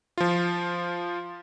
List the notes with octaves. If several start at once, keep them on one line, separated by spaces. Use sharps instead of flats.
F3 F4